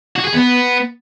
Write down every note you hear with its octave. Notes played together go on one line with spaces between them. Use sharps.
F#4
G#4
B3